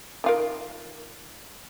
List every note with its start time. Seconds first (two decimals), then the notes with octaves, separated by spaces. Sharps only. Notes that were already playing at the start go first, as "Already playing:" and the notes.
0.24 D#3 F4 A#4